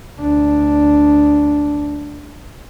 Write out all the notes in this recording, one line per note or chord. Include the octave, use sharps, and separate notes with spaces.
D2 D4